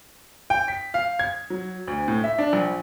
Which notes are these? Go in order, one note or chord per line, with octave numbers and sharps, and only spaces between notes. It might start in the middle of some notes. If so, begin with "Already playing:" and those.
G5
B6
F5
G#6
F#3
D2
A2
E5
D4
A#1